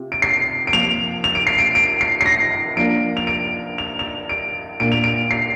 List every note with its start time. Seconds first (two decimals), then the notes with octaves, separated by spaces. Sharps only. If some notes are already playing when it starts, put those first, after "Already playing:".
Already playing: C3 F4
0.12 D7
0.22 C7
0.67 D7
0.73 F3 A#3 F4 F7
1.24 F7
1.35 D7
1.47 C7
1.58 D7
1.75 D7
2.01 C7
2.21 C7
2.26 A#6
2.77 F3 A#3 D4 D7
3.17 F7
3.27 D7
3.78 F7
3.99 F7
4.29 D7
4.80 A#2 A#3 D4 F4 D7
4.92 F7
5.04 D7
5.31 C7